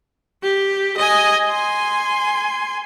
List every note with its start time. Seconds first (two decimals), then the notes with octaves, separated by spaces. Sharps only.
0.43 G4
0.97 D#5 G#5
1.49 G#5 C6